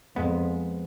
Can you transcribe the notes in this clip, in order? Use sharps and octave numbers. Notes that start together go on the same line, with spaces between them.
F2 F3 G#3 B3